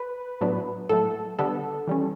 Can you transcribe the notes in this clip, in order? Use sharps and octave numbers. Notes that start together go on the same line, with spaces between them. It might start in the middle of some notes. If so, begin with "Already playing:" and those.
Already playing: B4
A2 F#3 B3 D4
A2 F#3 A3 A4
D3 G3 B3 D4 A4
E3 G3 C#4